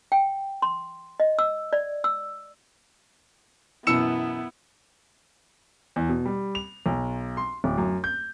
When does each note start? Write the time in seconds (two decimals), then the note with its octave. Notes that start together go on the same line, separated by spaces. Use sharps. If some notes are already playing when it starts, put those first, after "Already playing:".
0.12 G5
0.62 C6
1.20 D#5
1.39 E6
1.73 D5
2.04 E6
3.87 F#2 B2 E3 B3 E4 E6 C#7 E7
5.96 E2
6.09 B2
6.26 G3
6.55 F7
6.86 B1
7.37 C6
7.64 D1
7.78 F#2
8.04 G6